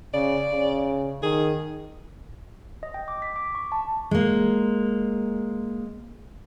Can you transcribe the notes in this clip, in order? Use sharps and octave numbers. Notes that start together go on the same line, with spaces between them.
C#3 D5
C#3
D#3 G#4
D#5
G5
D6
B6
D6
C#6
A5
G#3 A#3